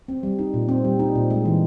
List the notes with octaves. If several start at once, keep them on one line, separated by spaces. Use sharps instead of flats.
C4
G3
D#4
A#2
C4
G3
D#4
A#2
G#3
E3